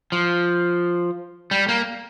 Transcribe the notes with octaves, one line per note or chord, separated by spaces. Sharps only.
F3
G3
A#3